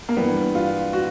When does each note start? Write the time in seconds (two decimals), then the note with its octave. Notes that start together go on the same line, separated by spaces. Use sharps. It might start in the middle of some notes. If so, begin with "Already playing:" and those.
0.09 A#3
0.17 G2 E3 G3 B3
0.55 F4
0.93 F#4